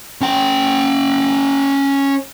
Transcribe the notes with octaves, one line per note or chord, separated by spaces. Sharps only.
C#4 G5